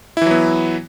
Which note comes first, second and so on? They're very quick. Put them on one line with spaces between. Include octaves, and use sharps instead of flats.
E4 E3 F#3 B3